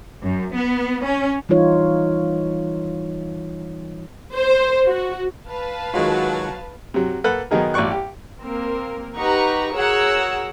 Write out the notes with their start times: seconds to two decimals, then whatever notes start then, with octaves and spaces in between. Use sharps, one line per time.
0.22 F#2
0.54 B3
1.04 C#4
1.49 E3 G3 D#4 F4 C#5
4.34 C5
4.87 F#4
5.48 B4 F5 A5
5.94 D#3 F#3 G#3 F4 F#4
6.94 C3 F#3
7.24 A#3 A4 B4 F#5
7.51 D#3 F#3 B3 D#4 G#4 A#4
7.74 A1 B2 D5 C#6 F#6
7.91 G4
8.40 A#3 C4 A#4
9.16 D#4 G4 B4 F#5 A#5 C#6
9.73 F#4 G#4 A#4 C#5 F#5 E6